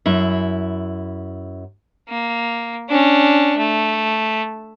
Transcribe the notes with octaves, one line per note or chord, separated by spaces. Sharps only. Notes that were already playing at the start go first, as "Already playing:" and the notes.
F#2 E4
A#3
C#4 D4
A3